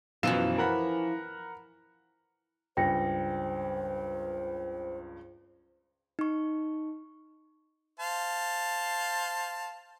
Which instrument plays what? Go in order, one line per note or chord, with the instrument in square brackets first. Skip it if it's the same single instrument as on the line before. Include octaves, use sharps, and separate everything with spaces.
[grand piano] F#2 B2 E7 [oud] E3 F3 F4
[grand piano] A#4 F#5 B5
[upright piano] C#2 G2 [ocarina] C5 [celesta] G5 A#6 C#7
[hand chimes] D#4 C#6
[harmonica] C5 F5 A5